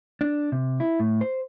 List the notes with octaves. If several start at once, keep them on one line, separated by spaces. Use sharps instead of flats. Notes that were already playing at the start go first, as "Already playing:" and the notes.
D4
C3
E4
A2
C5